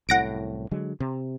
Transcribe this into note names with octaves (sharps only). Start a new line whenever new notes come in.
C2 F#2 A2 F#5 A#6 D7
D3 F#3 G#3
C3